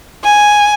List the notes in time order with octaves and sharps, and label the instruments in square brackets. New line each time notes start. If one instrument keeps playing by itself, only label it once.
[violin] G#5